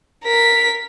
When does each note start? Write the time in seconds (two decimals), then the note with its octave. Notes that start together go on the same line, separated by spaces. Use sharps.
0.25 A#4 B6